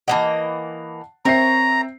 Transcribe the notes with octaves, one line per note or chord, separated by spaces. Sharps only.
E3 A#3 D#5 F#5 A5
C4 A#4 C#5 E5 A#5 C7